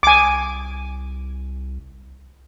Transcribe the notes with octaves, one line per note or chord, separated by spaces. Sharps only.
C2 G#5 D6